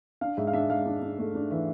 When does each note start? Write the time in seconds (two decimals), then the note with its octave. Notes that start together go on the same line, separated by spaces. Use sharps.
0.21 D4 F5
0.37 G#2 E5
0.47 F5
0.53 D4 E5
0.70 G#2 F5
0.86 D4
1.02 D4
1.18 A3
1.35 D4
1.51 E3 E5